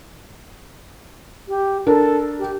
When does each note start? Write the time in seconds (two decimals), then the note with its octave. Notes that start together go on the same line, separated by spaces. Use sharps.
1.48 G4
1.87 D4 A4 A#4
2.39 G4